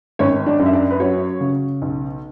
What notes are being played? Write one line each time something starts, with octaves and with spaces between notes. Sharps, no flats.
G#1 C#4 C#5
D4 D5
F#2
E5
D4 D5
B4
F#3 C#4 C#5
C#3
B1